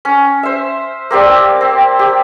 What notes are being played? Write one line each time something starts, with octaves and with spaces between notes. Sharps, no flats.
C#4
C5 E5
A#3 C4 G4 D5
C4
G4